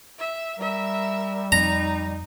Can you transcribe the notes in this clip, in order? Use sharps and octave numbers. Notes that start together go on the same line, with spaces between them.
E5
G3 A#4 E5
F2 D#4 A#5